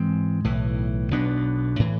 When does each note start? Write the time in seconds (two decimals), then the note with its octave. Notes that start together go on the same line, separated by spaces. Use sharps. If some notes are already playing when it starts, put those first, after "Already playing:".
Already playing: G#2 E3 G#3 C4
0.44 B1 A2 E3
1.11 B1 B2 B3 D4
1.79 A2 E3